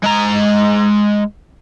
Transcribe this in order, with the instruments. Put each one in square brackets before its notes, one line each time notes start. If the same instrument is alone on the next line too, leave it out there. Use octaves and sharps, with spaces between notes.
[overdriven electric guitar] G#3 A#5